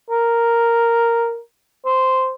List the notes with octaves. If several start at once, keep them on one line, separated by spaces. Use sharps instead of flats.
A#4
C5